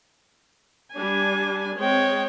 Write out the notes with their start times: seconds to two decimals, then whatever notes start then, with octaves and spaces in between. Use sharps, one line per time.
0.95 G3 D4 G#5
1.79 G#3 C4 C#5 G5